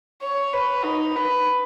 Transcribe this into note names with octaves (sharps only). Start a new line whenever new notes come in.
C#5
B4
D#4
B4